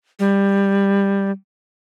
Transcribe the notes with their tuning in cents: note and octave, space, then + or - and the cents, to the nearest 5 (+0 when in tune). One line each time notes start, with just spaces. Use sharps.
G3 +15